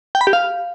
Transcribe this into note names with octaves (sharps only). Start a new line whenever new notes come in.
G5
B5
G4
F5